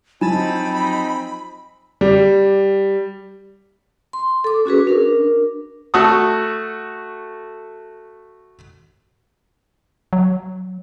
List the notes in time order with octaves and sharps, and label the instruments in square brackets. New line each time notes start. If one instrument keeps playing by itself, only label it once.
[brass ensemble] F3 C4 D#4 [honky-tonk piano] F#3 [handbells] G#5 A5 A6 [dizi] B5
[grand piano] G3
[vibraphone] C6
A4 D6
C#4 F#4 G#4 B4
D4 A#4
[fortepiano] A3 F#4 A4 C#6 D#6
[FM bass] F#3